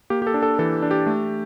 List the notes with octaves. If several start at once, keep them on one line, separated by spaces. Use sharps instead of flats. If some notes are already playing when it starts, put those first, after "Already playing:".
A#3 G4
G4
A4
D4
A4
E3 A4
D4
G4
A3